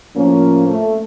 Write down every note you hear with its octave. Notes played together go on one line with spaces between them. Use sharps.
A2 F3 A#3 C#4
A3